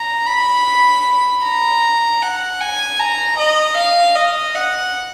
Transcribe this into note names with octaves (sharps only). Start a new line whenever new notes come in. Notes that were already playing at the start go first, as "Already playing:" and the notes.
Already playing: A#5
B5
A#5
F#5
G#5
A#5
D#5
F5
D#5
F#5